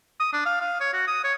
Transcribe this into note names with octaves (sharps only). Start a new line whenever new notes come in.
D#6
D4
F5
F5
C#5
F#4
D#6
C#5